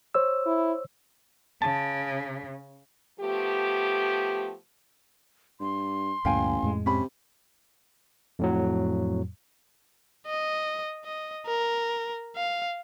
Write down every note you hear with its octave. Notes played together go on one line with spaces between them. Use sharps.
C5 C#5 E6
E4
C#3 A5
F3 A3 B3 G4
G2 C6
A1 D2 G2 A#2 F5 G5 G#5
F2 A2 G#3
C3 C#4 B5
F2 A2 F#3
D#5
D#5
A#4
F5